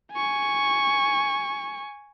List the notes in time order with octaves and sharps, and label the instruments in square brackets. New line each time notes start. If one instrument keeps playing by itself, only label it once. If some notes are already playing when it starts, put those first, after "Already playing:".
[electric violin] G#5 C#6